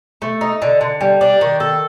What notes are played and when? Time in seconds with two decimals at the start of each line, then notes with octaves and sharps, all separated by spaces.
0.22 A3
0.41 D#4
0.62 D3
0.81 D3
1.01 G3
1.21 D4
1.41 D#3
1.60 A4